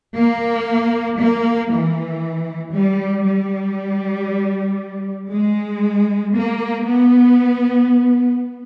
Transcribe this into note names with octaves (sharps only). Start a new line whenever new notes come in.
A#3
A#3
E3
G3
G3
G#3
A#3
B3